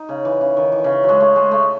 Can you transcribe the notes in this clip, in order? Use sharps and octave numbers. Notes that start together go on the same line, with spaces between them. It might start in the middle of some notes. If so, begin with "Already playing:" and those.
Already playing: D#4
C#3
E3
C#3
D#3
E3
C#3
F#3
G#3
A3
G#3
A3